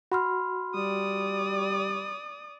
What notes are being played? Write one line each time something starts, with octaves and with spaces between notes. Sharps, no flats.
F#4 B5 C6 F6
G3 D5 D#6